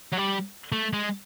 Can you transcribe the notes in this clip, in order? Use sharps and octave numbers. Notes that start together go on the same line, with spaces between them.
F#3
G3
A3
G#3